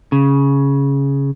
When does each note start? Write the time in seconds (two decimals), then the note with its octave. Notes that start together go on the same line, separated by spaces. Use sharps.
0.12 C#3